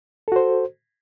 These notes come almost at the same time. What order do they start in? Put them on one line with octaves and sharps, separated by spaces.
A4 F#4 C5